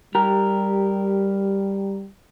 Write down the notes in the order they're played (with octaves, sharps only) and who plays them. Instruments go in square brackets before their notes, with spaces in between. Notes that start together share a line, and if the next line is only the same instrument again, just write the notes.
[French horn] G3 [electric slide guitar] G4 A#4